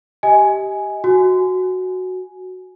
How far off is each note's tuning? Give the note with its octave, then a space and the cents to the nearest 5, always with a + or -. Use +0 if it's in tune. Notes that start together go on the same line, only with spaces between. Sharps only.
G4 -15 D#5 +35 G#5 +0
F#4 +0 G#5 +10